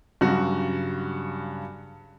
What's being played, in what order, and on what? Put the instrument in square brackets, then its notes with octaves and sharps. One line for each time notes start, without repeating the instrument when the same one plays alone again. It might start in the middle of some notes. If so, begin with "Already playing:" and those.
[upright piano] G2 F#4 [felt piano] C#3 F#3 G3